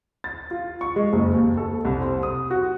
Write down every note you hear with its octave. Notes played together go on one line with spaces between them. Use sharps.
A6
F4
C#6
G#3
F#1
D#2
A4
C2
C5
D#6
F#4